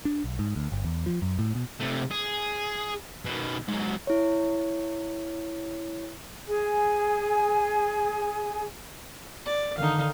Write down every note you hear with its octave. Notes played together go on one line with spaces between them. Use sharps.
D4
B1
G#2
D2
G1
E2
F3
F#2
A2
B2
C3 A3
G#4
B2 D#3
G#2 F#3
E4 C#5
G#4 G#5
D5
D3 D#3 D#4 F5